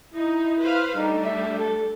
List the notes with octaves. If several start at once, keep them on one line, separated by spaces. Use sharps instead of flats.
D#4 E4
B4 C5 F5
G3 A3 D4 D#4
E5
A4